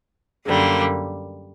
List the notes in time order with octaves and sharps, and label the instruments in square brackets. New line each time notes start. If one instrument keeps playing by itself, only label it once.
[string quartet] F#2 D3 G3 A#3